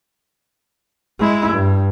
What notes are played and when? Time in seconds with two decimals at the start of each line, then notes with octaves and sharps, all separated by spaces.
1.19 G#3 E4
1.53 G2